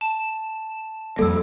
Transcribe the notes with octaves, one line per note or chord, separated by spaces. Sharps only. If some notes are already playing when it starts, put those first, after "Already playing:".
A5 E7
F2 G3 A#3 A4 E6